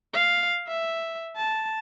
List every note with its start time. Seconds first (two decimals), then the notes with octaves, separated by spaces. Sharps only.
0.14 F5
0.68 E5
1.37 A5